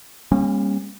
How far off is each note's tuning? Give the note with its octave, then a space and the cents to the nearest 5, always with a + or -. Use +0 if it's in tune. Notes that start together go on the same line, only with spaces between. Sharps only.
G3 +40 A#3 +20 C#4 -25